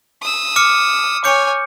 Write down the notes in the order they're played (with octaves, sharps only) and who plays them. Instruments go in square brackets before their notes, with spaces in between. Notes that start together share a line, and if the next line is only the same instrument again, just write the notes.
[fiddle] D#6 E6
[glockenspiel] D6 F6 C#7
[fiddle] C#5 G#5 [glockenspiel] D6 G6 C#7